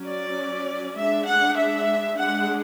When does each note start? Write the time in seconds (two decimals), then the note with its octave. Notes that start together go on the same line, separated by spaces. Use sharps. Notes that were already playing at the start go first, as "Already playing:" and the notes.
Already playing: F#3 C#4
0.08 D5
0.98 G#3 D4 E5
1.28 F#5
1.57 E5
2.18 G#3 D4 F#5